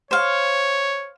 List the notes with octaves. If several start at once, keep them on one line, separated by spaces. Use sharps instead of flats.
C5 C#5 F5